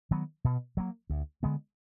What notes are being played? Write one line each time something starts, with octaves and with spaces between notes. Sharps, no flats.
D#3 F#3 B3
B2
F#3 A#3
D2
D3 G#3 B3